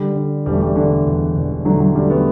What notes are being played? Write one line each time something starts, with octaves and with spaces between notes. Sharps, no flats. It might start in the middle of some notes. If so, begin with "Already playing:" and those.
Already playing: D3 G3
D3
E1 G3
A3
G3
D3
E1
E1
D3 F#3 A3
F#3
D3 G3
A3
G3 B3